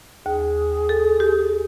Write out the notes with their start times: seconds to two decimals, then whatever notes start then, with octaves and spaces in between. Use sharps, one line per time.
0.26 D#2 G#4
0.89 A4
1.20 G4